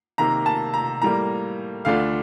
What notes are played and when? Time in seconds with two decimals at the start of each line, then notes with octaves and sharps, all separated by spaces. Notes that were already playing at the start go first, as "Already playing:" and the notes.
0.18 C3 D#3 A#3 A#5
0.46 A5
0.74 A#5
1.02 A2 G3 A#3 A#5
1.85 D2 D3 A3 D4 F4 F5